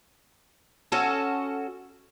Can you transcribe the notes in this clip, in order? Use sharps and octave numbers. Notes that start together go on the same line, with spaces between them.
C#4 F#4 A4